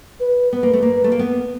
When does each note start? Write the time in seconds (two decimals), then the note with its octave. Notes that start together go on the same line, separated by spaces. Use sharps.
0.20 B4
0.52 B3 B4
0.63 A#3
0.73 A3
0.82 A#3
1.04 A3
1.12 A#3
1.19 B3